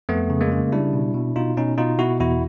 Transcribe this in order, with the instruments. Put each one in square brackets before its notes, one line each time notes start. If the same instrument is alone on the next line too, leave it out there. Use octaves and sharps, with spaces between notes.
[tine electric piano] F2 A3 B3
C#3
G#3 A#3
C#3
G3 D4 E4
B2
B2
B2 D#4 F4
B2 C#4 D#4
B2 D#4 F4
B2 E4 F#4
E2 E4 F#4